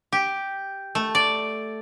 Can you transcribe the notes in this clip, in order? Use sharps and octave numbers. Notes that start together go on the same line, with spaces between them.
G4
A3
D5